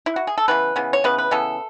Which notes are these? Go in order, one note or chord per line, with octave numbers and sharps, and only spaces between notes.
E4
F#4
G#4
A4
C#3 E3 B3 B4
C#3 E3 B3
C#5
C#3 E3 B3 B4
B4
C#3 E3 B3 A4